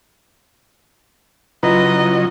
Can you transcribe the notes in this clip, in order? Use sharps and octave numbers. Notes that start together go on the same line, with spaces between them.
C#3 F#3 E4 F4 B4 D#5 A#5